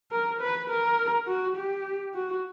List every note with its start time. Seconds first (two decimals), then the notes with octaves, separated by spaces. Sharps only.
0.12 A#4
0.41 B4
0.70 A#4
1.27 F#4
1.56 G4
2.14 F#4